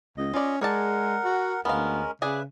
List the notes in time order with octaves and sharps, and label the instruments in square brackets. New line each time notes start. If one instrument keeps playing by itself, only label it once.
[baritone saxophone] C#2 [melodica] D#5
[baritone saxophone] C#4 [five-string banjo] F4 D5
[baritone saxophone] G#3 [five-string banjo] G#4 D5 A5 [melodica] A#4 F#5
[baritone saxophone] F#4
[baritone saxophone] D2 [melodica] G#3 C#4 A#4 [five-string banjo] B3 F5
[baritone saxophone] C#3 [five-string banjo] G#4 D5 G#5 [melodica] B4 E5